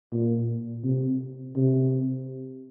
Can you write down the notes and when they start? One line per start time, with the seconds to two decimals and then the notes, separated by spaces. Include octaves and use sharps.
0.12 A#2
0.84 C3
1.56 C3